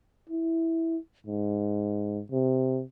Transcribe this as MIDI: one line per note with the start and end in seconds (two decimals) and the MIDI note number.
0.29 0.97 64
1.27 2.22 44
2.31 2.83 48